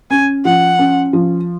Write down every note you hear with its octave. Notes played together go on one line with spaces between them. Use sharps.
C#4 G#5
F3 F#5
C#4
F3